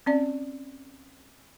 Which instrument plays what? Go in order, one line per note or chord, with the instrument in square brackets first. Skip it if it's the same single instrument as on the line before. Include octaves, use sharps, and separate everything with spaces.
[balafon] C4 C#4 D5